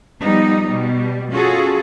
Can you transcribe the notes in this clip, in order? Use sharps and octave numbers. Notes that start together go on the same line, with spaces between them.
F3 G3 B3 D#4
B2 G3
C#4 F4 F#4 G#4 A4